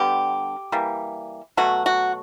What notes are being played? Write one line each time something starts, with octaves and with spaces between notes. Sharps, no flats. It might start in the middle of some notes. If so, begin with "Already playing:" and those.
Already playing: D3 G3 B3 G4
E3 G3 A#3
B2 F#3 A3 F#4
F#4